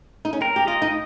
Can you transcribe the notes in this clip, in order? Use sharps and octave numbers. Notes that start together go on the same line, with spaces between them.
D#4
C#4
C4 A#4
G4
F4 D#5
D#4